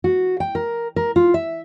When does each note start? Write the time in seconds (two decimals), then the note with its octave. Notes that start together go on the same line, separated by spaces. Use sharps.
0.04 F#4
0.40 G5
0.55 A#4
0.96 A#4
1.16 F4
1.34 E5